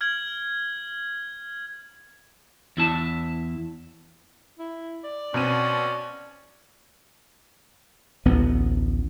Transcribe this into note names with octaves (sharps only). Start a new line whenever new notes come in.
F6 G#6 F#7
E2 E4 A5
E4
D5
B2 C4 C#4 D#7
A1 D2 B3